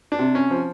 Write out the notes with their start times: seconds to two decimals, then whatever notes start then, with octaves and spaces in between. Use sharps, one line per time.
0.12 D4
0.19 C3
0.35 C#4
0.51 F3